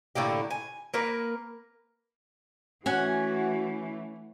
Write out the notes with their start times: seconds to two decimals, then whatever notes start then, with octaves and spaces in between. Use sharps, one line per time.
0.15 A2 D3 A#3 G4
0.50 G#5
0.94 A#3 A#4 B4
2.86 E3 A3 C#4 F#4 F#5 G#5